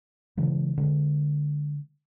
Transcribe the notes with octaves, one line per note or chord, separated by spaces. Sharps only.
C#3 E3 F#3 G#3
D3 G#3